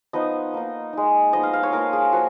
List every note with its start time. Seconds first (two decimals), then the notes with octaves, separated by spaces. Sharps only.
0.13 F3 B3 D#4 D#5
0.54 A#3 D#4
0.93 G#3 D#4
1.33 F3 B3 D#4 D#5
1.43 F5
1.53 F5
1.63 C#5
1.73 A#3 F4 A#4
1.93 G#4
2.13 F3 A#3 F#4